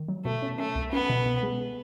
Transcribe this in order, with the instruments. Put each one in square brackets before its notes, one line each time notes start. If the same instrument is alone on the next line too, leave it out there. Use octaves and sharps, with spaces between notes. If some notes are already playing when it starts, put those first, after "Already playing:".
Already playing: [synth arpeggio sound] D#3
F#3
[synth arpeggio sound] B2 [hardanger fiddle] A3
[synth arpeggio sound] C#4
[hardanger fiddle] A3 [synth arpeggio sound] C#4
[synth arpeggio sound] C2
[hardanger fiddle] B3 [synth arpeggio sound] C#4
[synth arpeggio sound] B2
B2
G#3